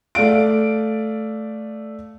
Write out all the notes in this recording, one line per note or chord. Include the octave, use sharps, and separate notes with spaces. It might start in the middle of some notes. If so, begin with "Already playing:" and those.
A3 D5 F5 D7